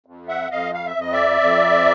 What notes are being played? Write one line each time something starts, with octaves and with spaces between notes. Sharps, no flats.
F2
E5 F#5
F2 D#5 F5
F5
E5
F2 D#5
D5 E5
F2